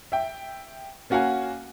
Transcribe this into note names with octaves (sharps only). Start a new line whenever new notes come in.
E5 G5
A#3 C#4 F#4 F5 F#5 G#5